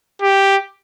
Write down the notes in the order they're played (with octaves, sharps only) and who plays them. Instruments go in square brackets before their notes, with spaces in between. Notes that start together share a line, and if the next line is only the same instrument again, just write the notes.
[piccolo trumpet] G4